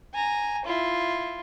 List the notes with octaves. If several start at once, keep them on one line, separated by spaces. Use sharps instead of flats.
G#5 A#5
E4 F4